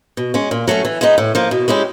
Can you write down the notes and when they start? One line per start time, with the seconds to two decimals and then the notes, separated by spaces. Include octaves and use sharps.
0.17 B2
0.34 G#3 C#4
0.51 A#2
0.68 F#3 A3 C#4
0.85 E3
1.01 G#3 B3 D#4
1.18 A2
1.35 F3 A#3
1.51 B2
1.68 G#3 C#4 E4 G4